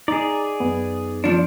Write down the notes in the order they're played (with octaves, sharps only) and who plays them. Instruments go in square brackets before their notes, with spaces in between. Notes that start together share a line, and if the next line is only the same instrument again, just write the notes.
[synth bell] D#4 [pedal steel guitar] G#4 D5 [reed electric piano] A#5
[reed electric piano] F#2 B3
[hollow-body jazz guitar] F3 D4